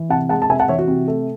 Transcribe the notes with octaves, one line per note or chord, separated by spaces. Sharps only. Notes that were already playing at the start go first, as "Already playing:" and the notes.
Already playing: E3
C3 F#5 A5
G#3 F#5 A5
A5
C3 E5 G#5
F#5 A5
E3 C#5 E5
F#4
C3
A3